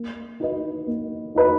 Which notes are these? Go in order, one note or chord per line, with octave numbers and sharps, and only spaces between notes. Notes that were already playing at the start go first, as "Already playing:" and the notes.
Already playing: A#3
D#4 F#4 B4 D#5
A#3
D#4 F#4 B4 D#5